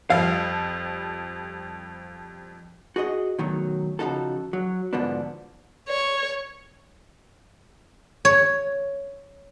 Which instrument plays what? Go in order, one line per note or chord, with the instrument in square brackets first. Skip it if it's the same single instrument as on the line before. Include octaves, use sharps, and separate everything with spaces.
[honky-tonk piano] F2 F3 G3 [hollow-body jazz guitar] F5
[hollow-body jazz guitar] F#4 G#4 C#5 D#5
B2 D#3 F#3 A3
C#3 F3 D#4 F#4 A4
F#3
G#2 B2 D3 F3 B3 D4
[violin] C#5
[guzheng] C#5